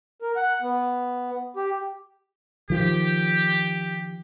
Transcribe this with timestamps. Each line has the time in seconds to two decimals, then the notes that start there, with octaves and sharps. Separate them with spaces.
0.22 A#4
0.36 F#5
0.62 B3
1.57 G4
2.70 D#3 F3 G4